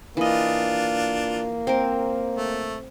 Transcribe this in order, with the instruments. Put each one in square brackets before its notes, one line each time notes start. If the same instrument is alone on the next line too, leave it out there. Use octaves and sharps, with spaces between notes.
[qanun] E3 D#5 [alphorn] A#3 [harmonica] D4 F4
[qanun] C4 A#4
[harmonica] A3